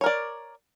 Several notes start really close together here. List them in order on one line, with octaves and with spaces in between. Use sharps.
C#5 A#4 D5